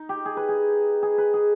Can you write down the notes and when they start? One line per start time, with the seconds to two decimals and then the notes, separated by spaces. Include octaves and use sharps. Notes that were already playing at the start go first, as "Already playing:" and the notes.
Already playing: D#4
0.09 G4
0.26 G#4
0.37 B4
0.49 G#4
1.03 G#4
1.18 B4
1.34 G#4